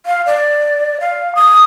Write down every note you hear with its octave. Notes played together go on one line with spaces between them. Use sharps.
F5
D5
F5
D#6